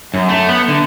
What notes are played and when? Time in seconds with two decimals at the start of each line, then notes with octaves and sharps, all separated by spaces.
0.14 F#2
0.29 A3
0.49 B3
0.68 D3